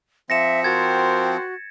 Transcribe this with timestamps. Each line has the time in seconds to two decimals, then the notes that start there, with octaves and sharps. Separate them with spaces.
0.30 F3 C4 E5 A#6 C#7 E7
0.64 F#4 A#4 C5 G5 G#6 A6